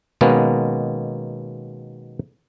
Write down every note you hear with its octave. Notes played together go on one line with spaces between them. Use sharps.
B2 D#3 G#3 A#3 B3 C#4